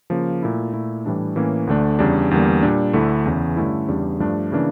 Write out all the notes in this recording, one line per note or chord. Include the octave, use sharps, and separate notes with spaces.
C#3 F3 A#3
A#2 A3 E4
A#2 A3 E4
A2 E3 G3 D4
A2 E3 A#3 C#4
D2 D3 A3 D4
E2 C#3 G3 D4
E2 D3 G3 A#3
A#2 G3 D4
D2 D3 A3 E4
E2 C#3 E3
G2 D3 A3 C#4 E4
E2 C#3 G3 D4
G2 F3 A3 D4
C#3 E3 A#3 D4